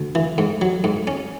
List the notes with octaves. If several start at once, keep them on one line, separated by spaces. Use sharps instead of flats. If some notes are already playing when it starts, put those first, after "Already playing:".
Already playing: D2
E3
G#2
F#3
G#2
C#4